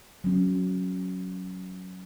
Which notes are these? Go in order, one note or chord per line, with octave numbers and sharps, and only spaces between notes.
F#3 C#4